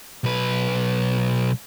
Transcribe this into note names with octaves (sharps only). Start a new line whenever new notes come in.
B1 B4